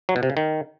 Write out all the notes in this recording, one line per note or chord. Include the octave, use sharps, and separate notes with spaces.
F#3
B2
C3
C#3
D#3